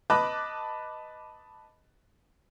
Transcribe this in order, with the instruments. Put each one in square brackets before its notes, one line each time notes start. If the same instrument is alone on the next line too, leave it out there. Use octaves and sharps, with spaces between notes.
[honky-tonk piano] B4 D#5 A5 B5 D6 F#6